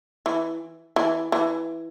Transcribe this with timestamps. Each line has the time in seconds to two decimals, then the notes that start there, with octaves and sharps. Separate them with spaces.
0.26 E3
0.96 E3
1.32 E3